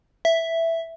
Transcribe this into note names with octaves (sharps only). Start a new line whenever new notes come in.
E5